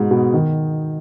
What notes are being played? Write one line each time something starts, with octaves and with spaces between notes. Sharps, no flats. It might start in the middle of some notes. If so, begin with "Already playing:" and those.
Already playing: G#2 B2
B2
D#3